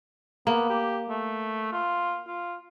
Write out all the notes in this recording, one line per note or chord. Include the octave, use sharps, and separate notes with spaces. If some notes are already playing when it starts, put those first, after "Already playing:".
A#3 B3
G4
A3
F4
F4